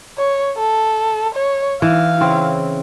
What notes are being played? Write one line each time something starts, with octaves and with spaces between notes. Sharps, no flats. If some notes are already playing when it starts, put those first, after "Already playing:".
C#5
A4
C#5
E3 F5
C#3 C4 E4